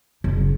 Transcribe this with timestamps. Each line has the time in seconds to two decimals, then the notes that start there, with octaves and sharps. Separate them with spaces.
0.24 F#1